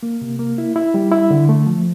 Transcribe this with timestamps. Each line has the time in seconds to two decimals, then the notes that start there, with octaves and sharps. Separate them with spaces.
0.03 A#3
0.21 C3
0.39 A#3
0.58 E4
0.76 E4
0.94 G3
1.12 E4
1.31 D3
1.49 A3
1.67 F3